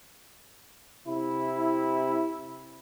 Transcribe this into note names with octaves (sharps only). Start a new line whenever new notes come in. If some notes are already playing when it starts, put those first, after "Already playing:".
C3 E4